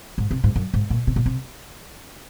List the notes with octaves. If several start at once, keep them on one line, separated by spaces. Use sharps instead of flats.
G#2
C3
G#2
F#2
G#2
A#2
C3
A#2
C3